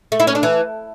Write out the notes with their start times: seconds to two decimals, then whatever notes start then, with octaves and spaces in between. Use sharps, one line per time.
0.12 A3
0.20 E4
0.27 C#4
0.35 D4
0.43 E3